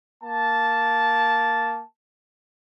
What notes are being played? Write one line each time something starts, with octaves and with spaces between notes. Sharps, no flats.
A#3 A5